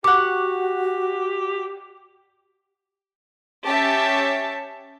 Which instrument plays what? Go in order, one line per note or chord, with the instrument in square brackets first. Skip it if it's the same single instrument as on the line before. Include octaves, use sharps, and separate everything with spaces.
[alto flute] F#4 [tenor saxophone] G4 [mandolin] F#5 C#6 [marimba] D6
[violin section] C#4 G4 C#5 E5 A5